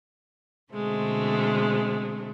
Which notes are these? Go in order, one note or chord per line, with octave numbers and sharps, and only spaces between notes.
B2 D3 G#3 A3 C4